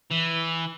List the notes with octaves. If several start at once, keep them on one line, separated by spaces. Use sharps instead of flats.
E3